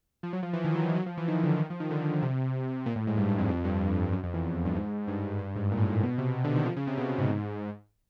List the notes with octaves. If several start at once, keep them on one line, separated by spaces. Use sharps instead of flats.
F3
F#3
F3
E3
D#3
F#3
F3
F#3
F3
E3
D#3
D3
D#3
F3
D#3
D3
C3
A#2
A2
G#2
G2
G2
F2
F2
G2
F2
F#2
F2
E2
G2
G#2
G2
G2
G#2
A#2
A2
G#2
A2
B2
C3
D3
D#3
F3
C#3
C3
B2
B2
G#2